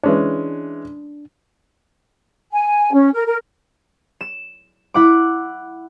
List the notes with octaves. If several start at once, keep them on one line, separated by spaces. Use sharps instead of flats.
E3 G#3 C#4 D4
G#5
C#4
A#4
A#4
E7
E4 F#5 D6